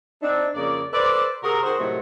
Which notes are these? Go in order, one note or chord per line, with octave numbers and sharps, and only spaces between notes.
C4 D4 D#4
F2 C#3 A#3 D5
A4 B4 C5 D5
C3 F#4 G#4 A#4
D#3 F#4 G#4 C5
A2 C3 D#3 F#3 A3 C5